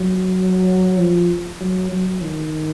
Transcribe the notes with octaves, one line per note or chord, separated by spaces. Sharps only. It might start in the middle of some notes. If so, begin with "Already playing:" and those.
Already playing: F#3
F3
F#3
F#3
D#3